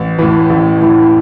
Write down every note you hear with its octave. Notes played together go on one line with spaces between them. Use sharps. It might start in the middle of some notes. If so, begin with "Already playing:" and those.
Already playing: A1
A2 E3
A1
A2 E3